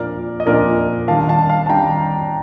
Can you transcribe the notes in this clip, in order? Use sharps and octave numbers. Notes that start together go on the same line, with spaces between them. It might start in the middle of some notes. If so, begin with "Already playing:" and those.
Already playing: A#2 F3 A#3 D4 A#4 D5
D#5
A#2 F3 A#3 D4 A#4 D5
D#3 G3 D4 F5 A5
F5 A5
F5 A5
A5
D#3 G3 D4 G5 A#5